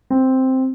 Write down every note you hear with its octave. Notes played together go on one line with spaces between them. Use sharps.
C4